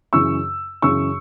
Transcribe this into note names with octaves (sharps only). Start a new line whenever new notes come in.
F#2 C#3 E3 C#6 E6
F#2 C#3 E3 C#6 E6